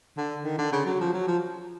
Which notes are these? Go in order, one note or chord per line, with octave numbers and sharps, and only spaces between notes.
D3
D#3
D3
C#3
F#3
F3
F#3
F3